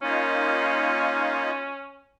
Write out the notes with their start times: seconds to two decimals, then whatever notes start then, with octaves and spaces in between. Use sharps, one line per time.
0.02 A#3 C#4 D#4 F4